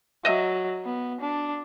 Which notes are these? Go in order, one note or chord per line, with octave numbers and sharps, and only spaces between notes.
F#3 D#5 E5
B3
D4